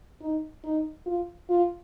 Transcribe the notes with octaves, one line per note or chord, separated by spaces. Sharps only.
D#4
D#4
F4
F4